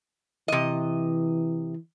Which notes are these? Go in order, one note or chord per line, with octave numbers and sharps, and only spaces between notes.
C3 E3 D#5